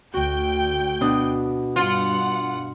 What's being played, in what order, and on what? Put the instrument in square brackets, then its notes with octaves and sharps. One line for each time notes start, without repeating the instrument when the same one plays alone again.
[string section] D2 G5 G6 [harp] F#4
[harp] B2 D4 D#6
[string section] G2 F#5 [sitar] F4